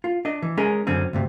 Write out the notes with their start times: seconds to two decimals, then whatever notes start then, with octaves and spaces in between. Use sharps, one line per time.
0.04 F4
0.25 D4 D#5
0.42 E3
0.57 G#3 C#4 G#4 A#4
0.87 F#2 D3 C4 C#4
1.13 D2 G2 C3